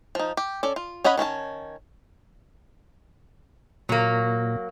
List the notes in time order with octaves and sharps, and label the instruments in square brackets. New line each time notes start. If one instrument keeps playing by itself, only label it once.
[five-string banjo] F3 D#4
G4
C#4 A4 D5
F4
C#4 C#5 D#5 F#5 B5
D#3 C#4 D#4 A5
[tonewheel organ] A#2 [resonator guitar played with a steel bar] F#3 A#3